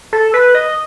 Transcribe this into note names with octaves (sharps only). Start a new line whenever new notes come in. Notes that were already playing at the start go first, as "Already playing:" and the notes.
A4
B4
D#5